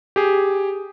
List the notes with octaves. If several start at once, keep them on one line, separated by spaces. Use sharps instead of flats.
G4 G#4